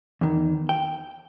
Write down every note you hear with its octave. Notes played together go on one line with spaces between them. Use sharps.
E2 D#3
G5